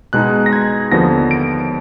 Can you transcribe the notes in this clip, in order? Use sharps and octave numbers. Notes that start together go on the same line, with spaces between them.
B2 G#3 D#4 F#6
A#6
G#6
D#2 D3 F3 B3 A#6
D7